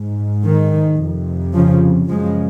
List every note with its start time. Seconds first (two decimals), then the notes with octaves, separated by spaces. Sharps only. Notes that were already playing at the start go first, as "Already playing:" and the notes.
Already playing: G#2
0.43 D#3
0.99 F2 C3
1.54 C#3 F3
2.09 F#2 C#3 F3 G#3